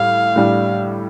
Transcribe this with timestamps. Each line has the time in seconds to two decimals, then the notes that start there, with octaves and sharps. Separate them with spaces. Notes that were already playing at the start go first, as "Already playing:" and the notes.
Already playing: A2 G3 F5
0.36 A2 G3 D4